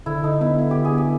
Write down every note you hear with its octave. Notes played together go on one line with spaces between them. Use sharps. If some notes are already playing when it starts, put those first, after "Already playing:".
D3 E4
D3 D#4
B3 E4
B3 E4
D3 G4
G#4
B3
G4